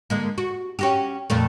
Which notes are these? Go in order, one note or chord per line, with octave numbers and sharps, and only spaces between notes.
D3 G#3 A#3
F#4
C#4 F#4 G4
F2 A#2 A3